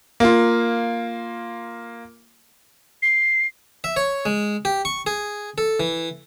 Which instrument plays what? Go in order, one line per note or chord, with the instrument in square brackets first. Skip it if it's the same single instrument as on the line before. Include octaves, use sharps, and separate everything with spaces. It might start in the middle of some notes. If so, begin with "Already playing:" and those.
[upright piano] A#3 F4
[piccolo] C7
[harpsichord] E5
C#5
G#3
G4
C#6
G#4
A4
E3